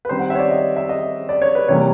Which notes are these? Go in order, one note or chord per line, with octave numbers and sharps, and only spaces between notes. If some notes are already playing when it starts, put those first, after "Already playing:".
B4
D#3 G3 C4 C5
F#5
C#5 E5
D5
D#5
E5
D#5
D5
C#5
B4
C3 E3 G3 A#3 C#5